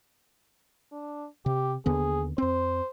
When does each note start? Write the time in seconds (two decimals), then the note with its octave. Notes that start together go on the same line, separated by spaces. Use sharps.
0.92 D4
1.46 C3 G4
1.86 D#2 D3 B3 G#4
2.38 F2 C4 C5